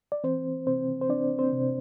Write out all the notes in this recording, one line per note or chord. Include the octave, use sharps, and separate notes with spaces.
D5
E3 C4 C5
C3 C4 C5
C5
C4 D4 D5
C4 C5
C3